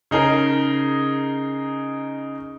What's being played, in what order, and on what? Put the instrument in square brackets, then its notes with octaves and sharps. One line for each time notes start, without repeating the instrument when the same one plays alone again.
[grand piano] C#3 D#4 G#4 A#4